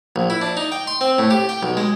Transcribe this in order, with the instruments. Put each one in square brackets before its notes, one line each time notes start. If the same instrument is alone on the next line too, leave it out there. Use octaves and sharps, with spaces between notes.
[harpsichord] A#1
E4
D4
D#4
G5
C6
C4
A2
G4
G5
B1
G#3